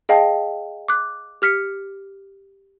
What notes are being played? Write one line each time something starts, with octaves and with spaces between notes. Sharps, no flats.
G#4 D#5 F5 G5 A5
D6 F#6
G4 F6 B6 C#7